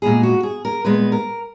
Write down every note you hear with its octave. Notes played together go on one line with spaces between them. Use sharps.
A#2 G#3 B3 G#4
F#4
G#4
A#4
A#2 G#3 B3 B4
A#4